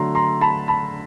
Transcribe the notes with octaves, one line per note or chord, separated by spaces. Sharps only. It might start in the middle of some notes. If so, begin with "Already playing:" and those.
Already playing: D3 F#3 A3 A#5 C6
A#5 C6
A5 B5
A5 B5